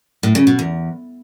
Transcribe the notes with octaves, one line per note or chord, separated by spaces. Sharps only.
A2
C#3
B2
E2